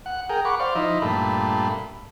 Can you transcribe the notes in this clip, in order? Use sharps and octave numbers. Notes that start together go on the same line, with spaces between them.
F#5
G#4 A#4 G5
F#5 B5 C#6 D6
C5 D5 F5
F3 D#4 E4
G2 A#2 A3 B5